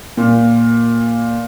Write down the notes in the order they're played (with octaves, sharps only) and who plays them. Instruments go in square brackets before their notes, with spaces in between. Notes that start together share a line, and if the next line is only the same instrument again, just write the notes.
[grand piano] A#2